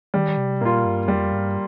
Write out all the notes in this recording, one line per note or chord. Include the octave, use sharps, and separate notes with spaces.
D#3 G3
C3
A#2 A#3 F4
G2
F2 G3
G2